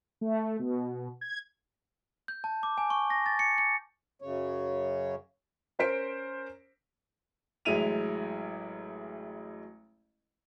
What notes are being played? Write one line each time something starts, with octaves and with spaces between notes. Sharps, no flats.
A3
B2
G#6
G6
A5
D6
G#5
C#6
A#6
A6
C#7
C#7
F#2 C#3 C#5
C#4 A#4 C5 B6 D7
A1 F#3 G#3 E4 D#7 F7